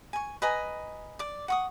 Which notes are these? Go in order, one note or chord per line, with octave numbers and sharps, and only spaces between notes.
G#5 C#6
B4 D#5 G#5 A#5
D5 D6
F#5 C#6 D#6